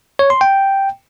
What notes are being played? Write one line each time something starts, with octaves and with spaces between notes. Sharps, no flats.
C#5
C6
G5